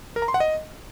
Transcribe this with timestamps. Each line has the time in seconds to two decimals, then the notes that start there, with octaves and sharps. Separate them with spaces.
0.16 A#4
0.22 A#5
0.28 C6
0.34 F#5
0.40 D#5